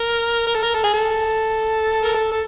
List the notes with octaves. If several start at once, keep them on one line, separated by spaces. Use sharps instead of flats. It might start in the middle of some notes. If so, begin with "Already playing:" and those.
Already playing: A#4
A#4
A4
A#4
A4
G#4
A4
A#4
A4
A4